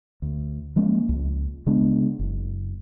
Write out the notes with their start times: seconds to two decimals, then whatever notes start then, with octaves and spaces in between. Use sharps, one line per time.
0.22 D2
0.76 F3 G#3 A#3 C#4
1.09 C#2
1.66 C#3 G#3 B3 D4
2.19 F#1